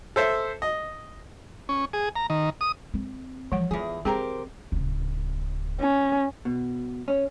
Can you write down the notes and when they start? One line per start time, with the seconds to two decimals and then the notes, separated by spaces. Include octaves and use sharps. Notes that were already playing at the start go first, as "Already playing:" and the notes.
0.16 A4 C5 E5
0.62 D#5
1.69 C#4
1.93 G#4
2.16 A#5
2.30 D#3
2.61 D#6
2.94 C4
3.52 E3 F3 F#5
3.71 E2 F4 G#4
4.05 C4 G4 G#4 A#4 C5 G5 A#5
4.72 D1 C#3
5.80 C#4
6.45 B2
7.08 C#4